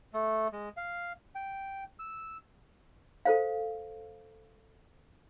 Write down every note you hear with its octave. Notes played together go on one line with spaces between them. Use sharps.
A3
G#3
F5
G5
E6
A4 C5 F5